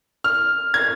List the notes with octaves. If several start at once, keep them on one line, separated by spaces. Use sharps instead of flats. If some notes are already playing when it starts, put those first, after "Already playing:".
F6
G#6